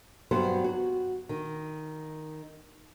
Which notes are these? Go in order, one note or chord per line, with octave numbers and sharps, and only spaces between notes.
G2 F#3 B3 C5
F#4
D#3